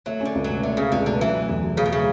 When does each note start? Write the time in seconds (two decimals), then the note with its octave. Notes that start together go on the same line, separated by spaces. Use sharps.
0.06 F#3 A3
0.21 D3 C#4
0.35 C#2
0.44 F#3
0.50 B2
0.63 D3 A3
0.77 C#3 C#4
0.92 C#2 D3
1.06 B2 D3
1.21 E3 F#3
1.35 A3
1.49 E2
1.63 B2
1.77 C#3 F#3
1.86 B2
1.92 C#3 A3